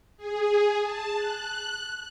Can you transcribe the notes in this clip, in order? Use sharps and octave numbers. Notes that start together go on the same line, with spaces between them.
G#4
A5
F#6